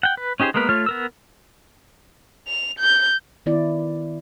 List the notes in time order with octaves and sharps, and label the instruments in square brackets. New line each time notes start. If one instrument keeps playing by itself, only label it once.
[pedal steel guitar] F#5 G5
B4
C#4 D#4 G4 G#4 C5
G#3 A#3 B3 A#4 B4
A3 F4 C#5 F6
B3 A#4 E6
[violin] F7
G6
[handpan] D#3 B3 E4 D5